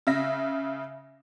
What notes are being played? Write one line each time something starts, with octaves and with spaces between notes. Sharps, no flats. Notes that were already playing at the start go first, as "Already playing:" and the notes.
C#3 E5 A#6